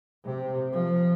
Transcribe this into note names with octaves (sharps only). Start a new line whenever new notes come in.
C3
F3